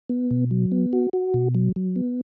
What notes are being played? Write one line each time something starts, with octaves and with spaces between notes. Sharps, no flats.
B3
B2
F#3
B3
F#4
F#4
B2
F#3
F#3
B3